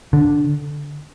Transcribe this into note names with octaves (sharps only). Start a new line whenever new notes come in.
D3